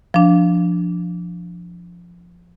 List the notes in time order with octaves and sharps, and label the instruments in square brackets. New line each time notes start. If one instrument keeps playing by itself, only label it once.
[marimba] F3 D4